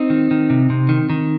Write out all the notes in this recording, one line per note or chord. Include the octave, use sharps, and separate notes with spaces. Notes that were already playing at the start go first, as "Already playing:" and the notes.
Already playing: C4 D#4
D#3
D#3
C3
C3
D#3
D#3